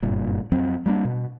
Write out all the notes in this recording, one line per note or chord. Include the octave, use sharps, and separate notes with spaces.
F#1 G2 A#2
F2 F#3 C4
G3 A#3 C#4 D4
B2